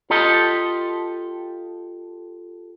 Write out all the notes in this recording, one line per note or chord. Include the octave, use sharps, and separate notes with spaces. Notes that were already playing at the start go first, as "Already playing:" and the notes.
F4 G4 A4 D#5